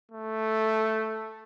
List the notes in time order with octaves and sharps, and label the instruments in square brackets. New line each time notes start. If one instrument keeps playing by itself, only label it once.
[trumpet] A3